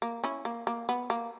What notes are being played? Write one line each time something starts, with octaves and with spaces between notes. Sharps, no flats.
A#3
C#4 E4
A#3
A#3
B3
A#3